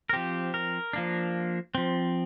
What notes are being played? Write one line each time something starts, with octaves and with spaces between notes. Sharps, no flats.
A#4
F3 C4 G4
A#4
F3 A#3 D4
F3 C4